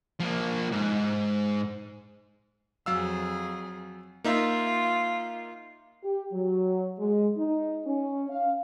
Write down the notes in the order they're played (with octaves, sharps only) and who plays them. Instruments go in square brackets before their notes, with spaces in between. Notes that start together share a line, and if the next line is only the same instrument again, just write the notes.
[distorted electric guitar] F3 A#3
G#2
[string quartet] F2 G#4 [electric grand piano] F#3 F5 E6
[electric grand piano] A#3 D#4 E5 [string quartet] F4
[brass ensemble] G4
F#3
G#3
D#4
C#4
F5